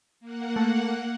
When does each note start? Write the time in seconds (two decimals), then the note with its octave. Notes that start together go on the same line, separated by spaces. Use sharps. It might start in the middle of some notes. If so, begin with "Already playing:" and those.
0.20 A#3 F#5
0.56 A3